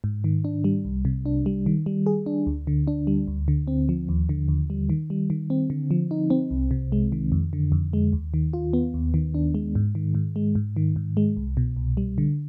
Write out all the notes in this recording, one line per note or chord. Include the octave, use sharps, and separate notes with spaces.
G#2
D#3
D4
G3
C2
C3
D4
G3
D#3
G3
G#4
D4
D2
D3
D4
G3
D2
D3
C4
F3
D#2
D3
D#2
G3
D#3
G3
D#3
C4
D3
F3
D#4
C4
C2
C3
G#3
D#3
F2
D3
F2
G#3
D#2
D#3
F4
B3
D#2
D#3
D4
G#3
G#2
D#3
G#2
G#3
G#2
D#3
G#2
G#3
C2
B2
C2
G3
D3